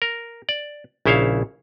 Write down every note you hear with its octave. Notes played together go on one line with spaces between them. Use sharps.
A#4
D5
A#1 C#3 E4 C5 C#5 F5